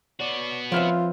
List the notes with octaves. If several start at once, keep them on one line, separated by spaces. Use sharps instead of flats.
B3 F#4 C#5 D5
F3 C4 F4 B4 C#5 E5 F6